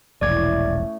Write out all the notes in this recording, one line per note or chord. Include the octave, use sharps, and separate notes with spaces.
E1 A#1 A2 A3 C#4 D5 D6 G#6